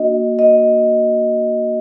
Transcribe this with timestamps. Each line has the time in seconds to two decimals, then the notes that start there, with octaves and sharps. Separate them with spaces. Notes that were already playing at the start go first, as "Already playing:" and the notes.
Already playing: A#3 D4 F#4 D#5
0.39 D#5